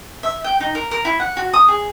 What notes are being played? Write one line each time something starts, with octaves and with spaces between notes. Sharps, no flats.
E5
G5
D#4
A#4
A#4
E4
F#5
F#4
D#6
G#4